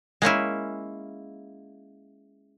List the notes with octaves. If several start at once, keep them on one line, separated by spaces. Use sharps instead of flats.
G#3 A#3 C#4 E4